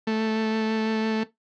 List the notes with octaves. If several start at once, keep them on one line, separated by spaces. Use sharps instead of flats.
A3